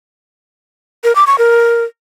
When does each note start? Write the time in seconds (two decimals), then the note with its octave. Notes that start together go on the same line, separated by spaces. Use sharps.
1.04 A#4
1.15 D6
1.27 C#6
1.38 A#4